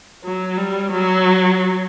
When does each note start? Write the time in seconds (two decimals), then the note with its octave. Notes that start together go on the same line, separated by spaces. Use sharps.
0.25 F#3
0.58 G3
0.93 F#3